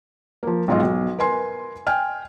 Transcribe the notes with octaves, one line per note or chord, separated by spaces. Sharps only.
F3 A#3
B1 G#2 F4 F#4 D#5
B1
A#4 B4 G#5 C6
G5 G#5 F6